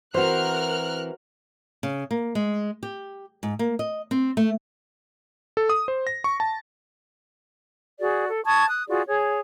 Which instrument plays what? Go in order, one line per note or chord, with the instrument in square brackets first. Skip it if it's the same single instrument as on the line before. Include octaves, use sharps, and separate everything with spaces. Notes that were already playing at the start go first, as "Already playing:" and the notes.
[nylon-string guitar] E3 C4 [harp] F#4 C5 [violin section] A#4 F6 F#6
[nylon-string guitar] C#3
A#3
G#3
G4
G#2
A#3
D#5
C4
A3
[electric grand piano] A4
D#6
C5
A#6
C#6
A5
[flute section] F#4 G#4 D5
A4
A5 C#6 D#6 G#6
D#6 F#6
F4 F#4 G#4 D5
G#4 C#5